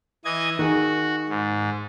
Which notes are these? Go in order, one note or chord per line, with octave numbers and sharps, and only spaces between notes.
E3 D#5 G#6
D#3 F#4 G#4
G#2